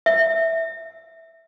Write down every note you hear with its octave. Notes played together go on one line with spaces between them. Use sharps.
E5